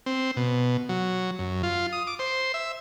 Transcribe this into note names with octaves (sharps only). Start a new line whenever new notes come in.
C4
B2
F#3
F#2
F4
D#6
D6
C5
E5